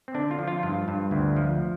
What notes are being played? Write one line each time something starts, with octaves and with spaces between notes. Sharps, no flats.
C4
D3 D4
F4
F3
F4
G2 F4
G2
D2
F3